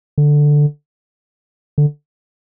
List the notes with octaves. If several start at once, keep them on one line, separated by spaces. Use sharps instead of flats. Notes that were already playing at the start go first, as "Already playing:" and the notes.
D3
D3